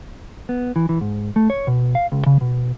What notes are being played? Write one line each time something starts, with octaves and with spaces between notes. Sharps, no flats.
B3
E3
E3
G#2
A3
C#5
B2
F5
C#2
C#3
B2